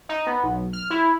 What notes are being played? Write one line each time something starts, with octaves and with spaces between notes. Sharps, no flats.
D#4
B3
B1
F6
E4